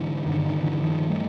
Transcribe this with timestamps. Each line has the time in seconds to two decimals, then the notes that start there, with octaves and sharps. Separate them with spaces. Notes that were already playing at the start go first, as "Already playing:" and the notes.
Already playing: G#2 D3 E3
0.26 G2 D3 D#3
0.45 D#3
0.63 D3 E3
0.82 D#3 F3
1.10 G3 A3